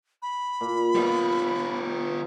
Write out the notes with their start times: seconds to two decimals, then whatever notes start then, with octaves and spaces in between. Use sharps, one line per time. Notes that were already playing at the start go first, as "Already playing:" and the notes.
0.22 B5
0.61 A#2
0.95 B2 G3 F4